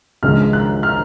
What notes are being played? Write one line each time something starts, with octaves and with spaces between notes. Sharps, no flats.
C#2 C#3 F3 G#3 F6
F#6
F6